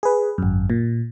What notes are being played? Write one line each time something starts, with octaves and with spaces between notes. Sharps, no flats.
G#4 B4
G#1 F#2
A#2